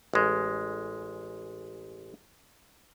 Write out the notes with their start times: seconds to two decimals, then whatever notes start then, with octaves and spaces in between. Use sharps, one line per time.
0.14 A1 G#3